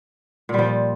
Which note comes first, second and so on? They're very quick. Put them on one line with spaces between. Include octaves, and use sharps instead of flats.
A#2 G3 F3